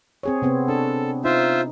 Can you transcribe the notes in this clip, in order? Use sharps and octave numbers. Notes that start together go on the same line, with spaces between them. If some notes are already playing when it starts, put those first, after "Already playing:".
C4 G#4 C#5
C3 B3 C4
D4 A4
D#4 F4 C5 E5